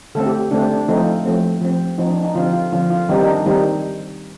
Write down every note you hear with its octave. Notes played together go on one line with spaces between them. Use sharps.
D3 A3 C4 A4
G4
D3 A3 C4 D4
D4
F3 A3 C4 D#4
F4
F3 A3 C4
F3 C4
F3 C4 D#4
D4
D#4
D3 F3 C4 F4
F4
D3 F3 C4 F4
F4
D#3 G3 C4 D#4
D#4
D4
D#3 G3 C4 D#4